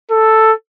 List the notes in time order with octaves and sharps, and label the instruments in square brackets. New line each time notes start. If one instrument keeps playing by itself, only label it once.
[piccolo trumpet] A4